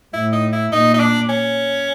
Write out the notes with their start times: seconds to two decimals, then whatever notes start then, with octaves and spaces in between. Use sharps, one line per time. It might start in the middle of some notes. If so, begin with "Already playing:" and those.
0.14 A2 E4
0.33 D#4
0.53 E4
0.72 A#2 D#4
0.94 D#4
1.00 D4
1.29 C#4